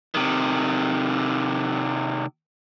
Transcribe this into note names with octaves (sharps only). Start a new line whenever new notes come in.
C3 D#3